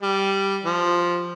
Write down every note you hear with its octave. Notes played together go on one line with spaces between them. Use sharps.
G3
F3